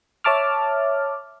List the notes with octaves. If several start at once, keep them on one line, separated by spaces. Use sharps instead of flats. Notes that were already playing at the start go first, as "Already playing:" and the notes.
C#5 E5 A5 D6 F6